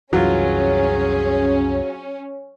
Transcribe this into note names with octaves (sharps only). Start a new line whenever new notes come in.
C2 F#2 E3 F#3 C#4 F4 G#4